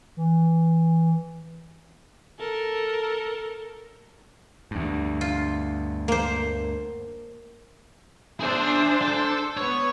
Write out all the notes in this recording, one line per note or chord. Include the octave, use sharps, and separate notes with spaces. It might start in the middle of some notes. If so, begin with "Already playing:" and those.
E3
A4 A#4
D2 G2
F4
A#3 C5
D4 G#4 C5 E5
A4
B3 C#5